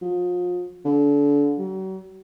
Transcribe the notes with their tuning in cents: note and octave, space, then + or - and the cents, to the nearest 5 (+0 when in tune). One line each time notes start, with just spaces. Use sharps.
F3 +35
D3 -30
F#3 +40